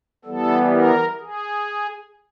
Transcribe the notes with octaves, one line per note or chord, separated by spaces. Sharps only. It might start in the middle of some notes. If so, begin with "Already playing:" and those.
E3 G3 B3 A4
A#4
G#4